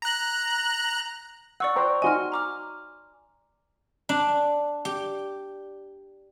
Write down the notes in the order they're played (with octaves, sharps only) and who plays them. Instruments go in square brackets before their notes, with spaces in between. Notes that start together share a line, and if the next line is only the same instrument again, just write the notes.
[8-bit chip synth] A#5 F#6
[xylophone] D5 C#6 E6 [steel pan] F#5
[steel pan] C5 G5 A#5
[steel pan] D#4 F#4 D#5 [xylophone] G#5 C6 F6
[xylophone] A#5 D6 F6
[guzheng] D4
G4